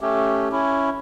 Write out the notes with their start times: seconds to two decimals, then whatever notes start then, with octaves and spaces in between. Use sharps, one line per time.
0.01 A3 C#4 G4
0.52 C#4 E4